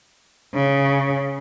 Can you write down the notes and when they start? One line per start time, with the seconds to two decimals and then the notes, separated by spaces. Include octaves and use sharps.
0.54 C#3